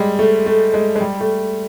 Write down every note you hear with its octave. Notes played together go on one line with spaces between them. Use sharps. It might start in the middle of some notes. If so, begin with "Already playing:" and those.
Already playing: G3 G#3
A3
A3
G#3
G#3
G3
A3